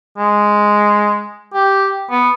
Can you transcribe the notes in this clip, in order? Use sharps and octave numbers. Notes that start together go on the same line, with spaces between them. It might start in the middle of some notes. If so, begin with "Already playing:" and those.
G#3
G4
B3